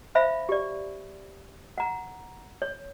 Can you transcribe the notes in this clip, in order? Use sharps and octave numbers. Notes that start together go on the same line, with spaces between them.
C5 E5 F5 B5
G4 D5
F#5 A#5
C#5